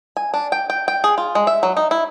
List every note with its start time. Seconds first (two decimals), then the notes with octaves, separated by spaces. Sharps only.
0.17 G#5
0.34 D4
0.52 G5
0.70 G5
0.88 G5
1.04 G#4
1.18 F4
1.35 G#3
1.47 E5
1.63 F#3
1.77 D#4
1.91 E4